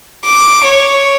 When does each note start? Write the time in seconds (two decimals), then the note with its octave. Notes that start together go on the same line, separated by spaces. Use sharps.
0.25 D6
0.64 C#5